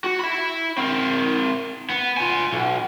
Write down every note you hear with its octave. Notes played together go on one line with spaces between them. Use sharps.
F#4
E5 B5
C4 A#4
B3
F4 G#5
B1